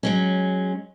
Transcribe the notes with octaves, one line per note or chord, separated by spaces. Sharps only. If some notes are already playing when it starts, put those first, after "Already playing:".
F#3 G#3 C#4